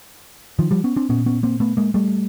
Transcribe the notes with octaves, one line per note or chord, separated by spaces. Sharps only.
D#3 F3
F3 G3
B3 C#4
C4 D4
A#2 B3 C#4
B3 C#4
A#3 C4
A3 B3
G#3 A#3
G3 A3